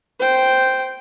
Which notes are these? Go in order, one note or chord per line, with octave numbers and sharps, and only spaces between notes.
C5 G5